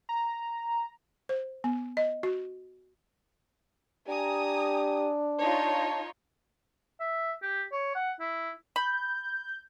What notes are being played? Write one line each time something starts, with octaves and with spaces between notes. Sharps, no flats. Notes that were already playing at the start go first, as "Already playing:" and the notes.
A#5
C5
B3
D#5
F#4
D4 G4 G#5 A#5 D#6
D#4 F4 C#5 A5
E5
G4
C#5
F#5
E4
B5 G6